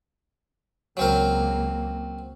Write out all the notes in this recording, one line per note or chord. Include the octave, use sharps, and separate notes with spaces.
C#2 F#3 A#3 C4 A#4